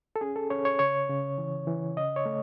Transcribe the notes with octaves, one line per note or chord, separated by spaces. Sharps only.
A4
C#4 G#4
A4
C#4 C#5
C#5
C#3 C#5
C#3
E3
E3
C#3 D#5
C#5
A3